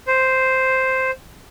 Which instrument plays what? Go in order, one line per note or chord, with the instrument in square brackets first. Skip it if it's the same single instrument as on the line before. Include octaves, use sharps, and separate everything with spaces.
[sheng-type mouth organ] C5